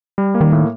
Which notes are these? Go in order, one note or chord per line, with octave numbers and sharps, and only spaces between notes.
G3
A#3
D#3
A2